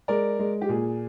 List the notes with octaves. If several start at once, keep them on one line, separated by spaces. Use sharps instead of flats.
G#3 A#4 D5
G#3
G4
A#2 G#4